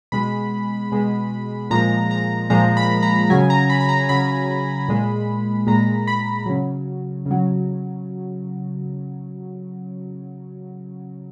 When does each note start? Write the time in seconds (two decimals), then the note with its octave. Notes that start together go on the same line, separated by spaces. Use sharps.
0.12 B2 G#3 B5
0.92 B2 G#3
1.70 A#2 F3 G#3 A#5
2.11 A#5
2.50 A#2 F3 G#3 A#5
2.77 B5
3.03 A#5
3.30 C#3 F#3 G#5
3.50 A#5
3.70 B5
3.81 B5
3.89 A#5
4.09 C#3 F#3 B5
4.88 A#2 G#3
5.67 A#2 G#3 A#5
6.07 B5
6.46 C#3 F#3
7.26 C#3
7.31 F#3